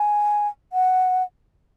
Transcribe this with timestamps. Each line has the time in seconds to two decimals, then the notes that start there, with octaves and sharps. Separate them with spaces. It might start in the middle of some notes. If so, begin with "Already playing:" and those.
Already playing: G#5
0.73 F#5